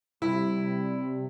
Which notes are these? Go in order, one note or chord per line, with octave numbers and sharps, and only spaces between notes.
C3 G3 E4